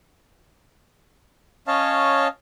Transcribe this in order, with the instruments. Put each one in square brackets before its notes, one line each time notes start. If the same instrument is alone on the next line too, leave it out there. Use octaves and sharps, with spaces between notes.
[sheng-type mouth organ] C#4 C#5 D#5 F5 A5